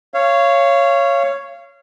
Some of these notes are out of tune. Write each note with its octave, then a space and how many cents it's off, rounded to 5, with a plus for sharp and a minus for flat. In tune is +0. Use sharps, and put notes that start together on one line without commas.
C#5 +0 F5 -25